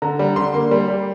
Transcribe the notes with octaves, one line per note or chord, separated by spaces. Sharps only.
D3 A#5
G3
D3 C6
A#3
G3
G3